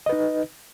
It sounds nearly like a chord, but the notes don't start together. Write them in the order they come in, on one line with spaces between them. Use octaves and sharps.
D#5 B4 D#4